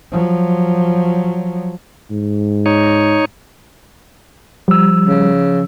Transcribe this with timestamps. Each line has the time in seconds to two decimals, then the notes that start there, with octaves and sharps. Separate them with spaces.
0.12 F3 F#3
2.11 G#2
2.66 D#4 C#5
4.68 F3 G3 E6
5.07 C#3